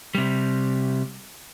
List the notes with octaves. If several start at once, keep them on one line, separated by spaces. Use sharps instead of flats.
C3 G3